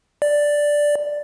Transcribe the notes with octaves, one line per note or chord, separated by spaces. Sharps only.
D5